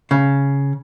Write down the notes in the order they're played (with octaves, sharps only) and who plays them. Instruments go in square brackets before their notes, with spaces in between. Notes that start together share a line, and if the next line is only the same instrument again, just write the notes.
[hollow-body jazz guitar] C#3